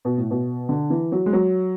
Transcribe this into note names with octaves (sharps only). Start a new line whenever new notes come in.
B2
A2
B2
D3
E3
F#3
G#3
F#3